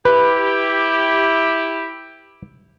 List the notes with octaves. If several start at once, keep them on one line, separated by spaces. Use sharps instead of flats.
E4 G4 B4